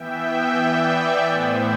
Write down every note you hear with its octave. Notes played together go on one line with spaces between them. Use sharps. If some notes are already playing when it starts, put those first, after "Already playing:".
Already playing: E3 B3 E5 G5
D5
A2 E3 B3 C5 E5